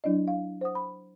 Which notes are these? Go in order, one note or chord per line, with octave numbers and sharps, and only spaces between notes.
F#3 D4 E4 D5 D#5
F5
C5 F#5 D#6
B5